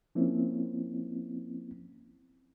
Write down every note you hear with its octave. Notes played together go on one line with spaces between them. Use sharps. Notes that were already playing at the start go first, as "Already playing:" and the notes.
F3 A#3 C4 C#4 E4